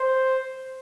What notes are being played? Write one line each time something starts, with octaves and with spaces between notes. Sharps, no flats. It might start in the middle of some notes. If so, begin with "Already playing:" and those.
Already playing: C5